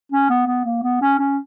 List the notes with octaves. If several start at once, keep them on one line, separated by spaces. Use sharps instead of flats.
C#4
B3
B3
A#3
B3
C#4
C#4